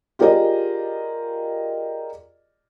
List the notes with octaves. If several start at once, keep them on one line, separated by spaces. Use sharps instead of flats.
F4 G4 G#4 A#4 D5 D#5